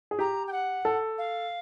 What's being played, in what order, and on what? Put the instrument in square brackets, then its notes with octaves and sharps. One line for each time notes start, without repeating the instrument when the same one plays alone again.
[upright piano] G#4
[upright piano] G4 [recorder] A#5
[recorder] G5
F#5
[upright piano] A4
[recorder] F5